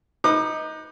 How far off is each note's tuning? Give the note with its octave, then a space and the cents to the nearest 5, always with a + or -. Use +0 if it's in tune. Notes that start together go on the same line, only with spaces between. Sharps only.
D#4 +15 B4 -5 D6 +40